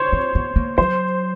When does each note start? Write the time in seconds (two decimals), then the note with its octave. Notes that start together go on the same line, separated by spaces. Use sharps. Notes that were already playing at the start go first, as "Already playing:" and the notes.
Already playing: C5 C#5
0.13 C4
0.35 B3
0.56 A#3
0.78 F#3 C5